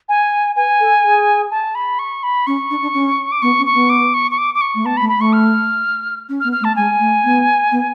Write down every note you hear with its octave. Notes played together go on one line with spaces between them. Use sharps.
G#5
B4 G#5
A4
G#4
A5
B5
C#6
B5
C#4 C#6
D4
D4
C#4
D6
B3 C#6
C#4
C#6
B3
D6
C#6
C#6
D6
D6
C#6
A3
B3 A5
B5
A3
B5
A3 C#6
F6
C#4
F6
B3
F6
A3
A5
G#3 G#5
A3
B3
B3